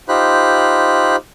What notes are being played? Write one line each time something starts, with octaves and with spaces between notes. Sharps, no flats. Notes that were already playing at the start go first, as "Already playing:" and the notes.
D#4 F4 G4 C5 B5 F#6